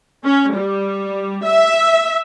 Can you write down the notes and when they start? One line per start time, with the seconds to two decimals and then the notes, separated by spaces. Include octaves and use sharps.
0.24 C#4
0.53 G3
1.44 E5